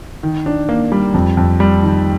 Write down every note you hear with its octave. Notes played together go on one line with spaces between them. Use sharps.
D#3
D4
A#3
G3
F2
F2
G3
D#3